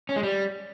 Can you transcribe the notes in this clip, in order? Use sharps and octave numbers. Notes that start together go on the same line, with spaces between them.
C#4
G#3
G3